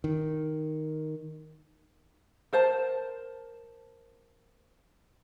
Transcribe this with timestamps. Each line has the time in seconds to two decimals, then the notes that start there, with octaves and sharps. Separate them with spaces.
0.04 D#3
2.53 A#4 C5 A5